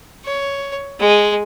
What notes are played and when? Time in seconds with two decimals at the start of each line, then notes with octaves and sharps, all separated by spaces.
0.25 C#5
1.00 G#3